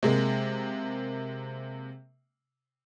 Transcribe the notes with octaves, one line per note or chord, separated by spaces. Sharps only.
C3 G#3 A#3